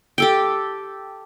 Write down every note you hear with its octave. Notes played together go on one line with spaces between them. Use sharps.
G4 A4 G5